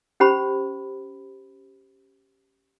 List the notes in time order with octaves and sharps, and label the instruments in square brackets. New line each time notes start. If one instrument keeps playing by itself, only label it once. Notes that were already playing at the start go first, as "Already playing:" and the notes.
[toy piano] C#4 G4 C5 B5